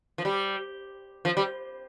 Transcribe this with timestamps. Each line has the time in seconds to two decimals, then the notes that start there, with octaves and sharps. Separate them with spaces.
0.18 F3
0.25 G3
1.25 F3
1.37 G3